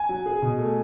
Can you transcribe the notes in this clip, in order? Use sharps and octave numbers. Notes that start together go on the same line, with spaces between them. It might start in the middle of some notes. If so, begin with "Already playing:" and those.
Already playing: G#5
F#3
G#4
B2
A3